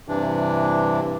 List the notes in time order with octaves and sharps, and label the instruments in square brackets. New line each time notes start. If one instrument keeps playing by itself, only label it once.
[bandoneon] G2 C3 E3 D4